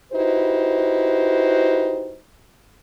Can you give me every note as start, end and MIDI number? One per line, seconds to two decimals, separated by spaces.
0.13 2.17 63
0.13 2.17 64
0.13 2.17 66
0.13 2.17 67
0.13 2.17 71
0.13 2.17 72